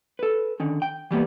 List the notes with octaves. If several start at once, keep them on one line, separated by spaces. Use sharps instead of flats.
A4 B4
D3 D#3 C#4
G5
E3 G3 A#3 B3